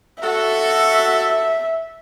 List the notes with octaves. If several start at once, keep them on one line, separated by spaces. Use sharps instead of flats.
F#4 A4 E5